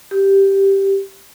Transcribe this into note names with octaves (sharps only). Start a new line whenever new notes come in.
G4